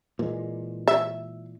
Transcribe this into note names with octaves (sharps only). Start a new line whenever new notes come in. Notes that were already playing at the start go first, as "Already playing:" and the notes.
A#2 E3 G#3
E5